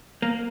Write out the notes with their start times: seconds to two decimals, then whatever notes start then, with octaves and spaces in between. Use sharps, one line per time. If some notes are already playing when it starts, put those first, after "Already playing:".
0.22 A#3